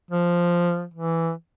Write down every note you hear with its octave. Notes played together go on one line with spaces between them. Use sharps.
F3
E3